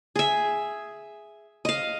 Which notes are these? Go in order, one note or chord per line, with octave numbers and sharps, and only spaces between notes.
G#4 E5
D#5 F5